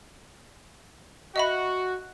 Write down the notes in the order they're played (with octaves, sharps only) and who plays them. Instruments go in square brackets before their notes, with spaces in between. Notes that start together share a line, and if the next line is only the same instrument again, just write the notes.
[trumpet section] F#4 [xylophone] D#5 E5 B5